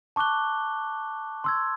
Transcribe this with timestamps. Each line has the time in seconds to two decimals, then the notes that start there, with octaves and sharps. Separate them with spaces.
0.16 A5 C#6 D6 F#6 G7
1.44 C6 E6 G#6